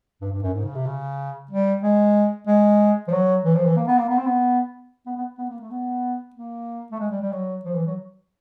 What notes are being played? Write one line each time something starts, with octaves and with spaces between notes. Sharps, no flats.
G2
G2
F#2
G#2
C#3
C3
C#3
G3
G#3
G#3
F3
F#3
E3
F3
E3
A#3
B3
A#3
B3
C4
B3
B3
B3
B3
A#3
A3
B3
A#3
A3
G#3
G3
G3
F#3
F3
E3
F#3